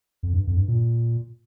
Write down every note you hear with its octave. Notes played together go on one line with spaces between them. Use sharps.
F2
G2
F2
G2
A#2